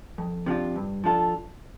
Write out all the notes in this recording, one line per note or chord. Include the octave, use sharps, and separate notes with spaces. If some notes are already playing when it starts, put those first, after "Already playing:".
F2
C3 F3 D4 F4
G2
F3 D4 F4 A4